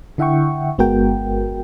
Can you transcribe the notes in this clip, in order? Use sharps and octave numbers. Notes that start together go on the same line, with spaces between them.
D3 E4 E5 F#5 G5 C#6
G1 G#3 B3 F#4 A#4 G5